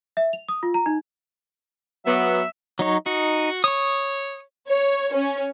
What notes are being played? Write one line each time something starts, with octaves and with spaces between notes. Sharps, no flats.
E5
F7
D#6
F4
A#5
D#4
F#3 B3 E5
F#3 D#4 C#5
D#4 F#4
C#5 C#6 D#6
C#5
C#4